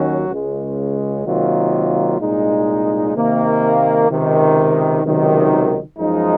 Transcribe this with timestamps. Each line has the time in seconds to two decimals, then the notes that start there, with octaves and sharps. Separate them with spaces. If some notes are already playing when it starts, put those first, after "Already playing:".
Already playing: D#2 D#3 F#3 C#4 F#4
0.29 C#2 C#3 G#3
1.25 C3 D#3 F#3 A#3 F4
2.19 C2 A#2 G#3 D#4
3.14 C3 D#3 A#3
4.08 C#2 C3 D#3
5.02 C#2 C3 D#3 F#3
5.97 F#2 F3 G#3 D#4